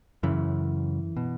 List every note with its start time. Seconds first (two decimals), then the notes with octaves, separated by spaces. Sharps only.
0.23 F#2 C#3 E3
1.17 B2